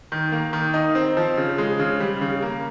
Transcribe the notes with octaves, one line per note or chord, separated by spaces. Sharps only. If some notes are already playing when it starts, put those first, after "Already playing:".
D#3
A#3
D#3
D#4
C4
F3
C#3
G#3
C#3
G3
C#3
A#3